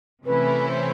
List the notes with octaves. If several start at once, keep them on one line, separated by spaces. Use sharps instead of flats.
C3 E3 A3 C#4 E4 B4
C5